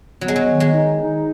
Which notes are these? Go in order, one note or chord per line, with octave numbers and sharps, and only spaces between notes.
F#3 B3
G#3
F#3
D#3
G#3
D#4
D#4